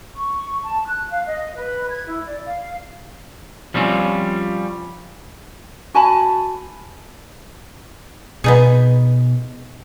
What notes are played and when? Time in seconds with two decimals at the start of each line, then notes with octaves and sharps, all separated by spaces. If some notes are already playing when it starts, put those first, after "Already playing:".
0.16 C#6
0.63 A5
0.86 F#6
1.11 F5
1.26 D#5
1.55 B4
1.90 G#6
2.06 E4
2.26 D5
2.46 F5
3.74 F3 G3 C4 C#4
5.94 F#4 G#5 A5 B5
8.44 B2 B3 D#4 G#4